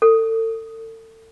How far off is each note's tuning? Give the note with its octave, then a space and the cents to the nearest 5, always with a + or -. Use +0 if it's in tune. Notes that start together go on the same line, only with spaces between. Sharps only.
A4 +35